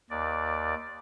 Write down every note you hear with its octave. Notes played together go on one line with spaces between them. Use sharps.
D#2 D5